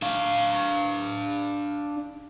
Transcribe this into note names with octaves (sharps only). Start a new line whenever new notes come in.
D4 F5